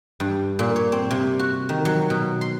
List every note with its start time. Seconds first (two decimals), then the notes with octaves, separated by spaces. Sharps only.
0.20 G2
0.59 A#2
0.76 C#5
0.92 C4
1.11 C3
1.39 F#4
1.69 D#3
1.85 F#3
2.10 B2
2.41 C6